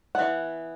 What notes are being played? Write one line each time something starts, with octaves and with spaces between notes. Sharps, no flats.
E3 B3 F#5